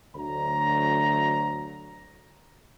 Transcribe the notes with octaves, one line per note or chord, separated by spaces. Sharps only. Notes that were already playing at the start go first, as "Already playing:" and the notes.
D2 F#3 A#5